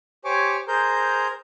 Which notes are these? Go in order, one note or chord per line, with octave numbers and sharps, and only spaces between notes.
G4 C5 C#5 G#5 C#6 D6
G#4 A#4 C5 A#5 G6